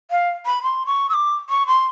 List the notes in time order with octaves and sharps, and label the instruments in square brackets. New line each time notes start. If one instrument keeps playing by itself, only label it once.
[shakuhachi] F5
B5
C6
C#6
E6
D6
C#6
C6